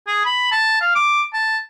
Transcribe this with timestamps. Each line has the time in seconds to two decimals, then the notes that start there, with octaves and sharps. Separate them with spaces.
0.07 G#4
0.25 B5
0.52 A5
0.81 F5
0.95 D6
1.33 A5